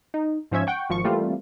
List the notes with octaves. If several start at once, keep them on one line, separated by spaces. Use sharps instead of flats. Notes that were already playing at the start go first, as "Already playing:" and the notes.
D#4
G#2 F3 C#4 E5 G#6
F#5 G5 C#6
G#1 F3 C#6
E3 G3 A3 A#3 C4 F4